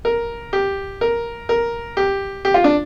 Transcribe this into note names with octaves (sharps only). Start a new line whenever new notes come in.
A#4
G4
A#4
A#4
G4
G4
F4
D4